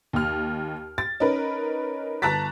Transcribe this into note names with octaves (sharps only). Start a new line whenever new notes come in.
D#2 F6
A6
C#4 D#4 A#4 B4
G1 A5 A#5 F#6 A6 B6